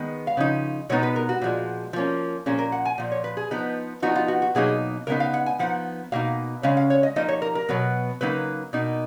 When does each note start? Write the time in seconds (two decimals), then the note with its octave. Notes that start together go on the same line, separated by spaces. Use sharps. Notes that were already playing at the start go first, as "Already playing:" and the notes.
Already playing: D#3 G#3 B3
0.27 F5
0.37 C#3 F3 D#4
0.89 B2 G#3 B3 D#4 C#5
1.03 B4
1.16 A#4
1.29 F#4
1.42 A#2 F3 G#3
1.93 F3 A#3 C#4
2.46 A#2 F3 A#3 C#4 G#4
2.58 A#4
2.72 F#5
2.85 G#5
2.98 A#2 F3
3.12 C#5
3.24 B4
3.37 G#4
3.51 F3 B3 D#4
4.02 F3 B3 D#4 F#4
4.16 F4
4.28 F#4
4.42 F#4
4.55 B2 F#3 A#3 D#4 G#4
5.07 C#3 G#3 B3 D#4 A#4
5.20 F5
5.34 F#5
5.46 G#5
5.59 F3 B3 D#4 F#5
6.12 B2 A#3 D#4 F5
6.63 C#3 G#3 C#4 F5
6.77 F5
6.90 C#5
7.03 D#5
7.16 F3 A#3 D#4 D#5
7.28 C#5
7.42 A#4
7.55 A#4
7.69 B2 F#3 B3
8.21 C#3 F#3 A#3 D#4 B4
8.73 B2 A#3 D#4